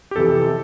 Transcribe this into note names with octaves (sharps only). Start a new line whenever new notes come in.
G4
F2 C3 E3 A4